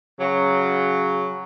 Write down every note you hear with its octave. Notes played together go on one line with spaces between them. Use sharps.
C#3 F#3